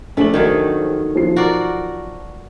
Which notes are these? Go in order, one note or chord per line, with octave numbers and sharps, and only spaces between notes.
A#1 A3 D4 F#7
D#3 F#3 A3
F3 C7
F#4 A#4 D5